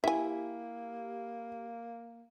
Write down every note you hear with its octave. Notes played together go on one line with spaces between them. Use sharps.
A#3 E4 G4 E5 G#5